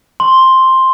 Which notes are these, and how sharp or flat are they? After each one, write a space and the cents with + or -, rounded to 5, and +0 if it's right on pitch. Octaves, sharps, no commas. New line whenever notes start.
C6 +5